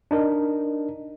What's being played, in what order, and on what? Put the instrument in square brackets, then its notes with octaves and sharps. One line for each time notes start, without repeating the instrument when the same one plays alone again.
[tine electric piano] D4 D#4 A#4